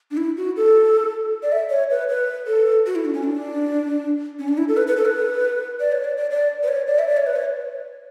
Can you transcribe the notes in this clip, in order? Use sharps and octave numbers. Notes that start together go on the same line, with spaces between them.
D4
E4
F#4
A4
D5
E5
C#5
B4
B4
A4
F#4
E4
D4
C#4
D4
C#4
D4
E4
A4
B4
B4
A4
B4
D5
C#5
D5
D5
D5
B4
C#5
D5
E5
D5
C#5
B4
C#5